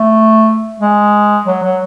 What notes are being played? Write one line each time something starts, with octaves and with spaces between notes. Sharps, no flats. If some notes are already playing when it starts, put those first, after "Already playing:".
Already playing: A3
G#3
F#3
F#3